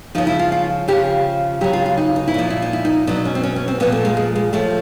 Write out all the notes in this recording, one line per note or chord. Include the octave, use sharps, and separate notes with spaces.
C#3 F3 D#4
E4
F4
F4
C#3 F3 G4
C#3 F#3 G4
F4
F4
D#4
D#4
E4
A#2 F3 D#4
E4
D#4
E4
D#4
B2 F#3 D4
C#4
C4
C#4
C#4
C4
A#2 F3 B3
A3
G#3
G#3
G#3
A2 F3 A3